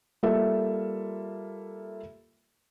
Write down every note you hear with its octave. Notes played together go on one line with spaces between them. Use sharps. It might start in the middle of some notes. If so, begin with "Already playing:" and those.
G3 A#3 F4 A4 E5